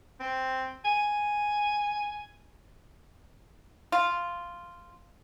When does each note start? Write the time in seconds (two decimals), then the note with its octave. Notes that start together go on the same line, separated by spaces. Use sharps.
0.20 C4
0.85 G#5
3.92 F4